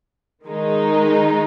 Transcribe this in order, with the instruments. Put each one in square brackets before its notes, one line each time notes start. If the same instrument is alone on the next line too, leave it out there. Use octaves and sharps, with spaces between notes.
[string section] D#3 G#3 D#4